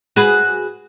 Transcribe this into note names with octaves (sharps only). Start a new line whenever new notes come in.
F#4 G#4 B4